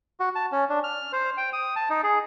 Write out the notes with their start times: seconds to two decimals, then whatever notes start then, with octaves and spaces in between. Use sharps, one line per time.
0.20 F#4
0.35 A5
0.52 C#4
0.69 D4
0.84 F6
1.13 C5
1.37 G5
1.53 D#6
1.76 A5
1.90 D#4
2.04 G#4